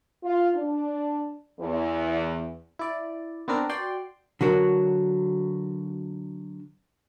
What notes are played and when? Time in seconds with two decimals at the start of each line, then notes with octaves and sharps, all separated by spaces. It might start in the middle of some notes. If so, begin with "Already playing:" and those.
0.24 F4
0.55 D4
1.60 E2
2.79 E4 D5
3.48 B3 C4 D4 A#4
3.70 F#4 D5 G5 C6
4.41 D3 F#3 F#4 A#4